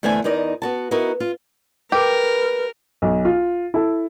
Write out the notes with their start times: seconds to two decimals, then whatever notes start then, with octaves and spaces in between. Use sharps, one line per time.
0.03 E2 D3 A3 C4 D4 G#5
0.24 E2 D#4 A#4 D5 D#5
0.62 B3 F#4 A5
0.91 B3 D#4 E4 F#4 A#4
1.20 F4
1.92 G4 A#4 B4
3.02 B1
3.25 F4
3.74 E4 A4